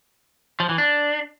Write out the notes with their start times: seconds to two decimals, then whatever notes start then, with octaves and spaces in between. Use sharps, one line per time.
0.60 F3
0.69 E3
0.78 D4